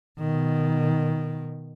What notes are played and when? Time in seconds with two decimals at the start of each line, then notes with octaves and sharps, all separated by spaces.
0.19 B2 D#3